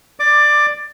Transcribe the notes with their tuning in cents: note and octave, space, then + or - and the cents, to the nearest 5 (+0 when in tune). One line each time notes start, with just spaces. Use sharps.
D5 +15 D6 +10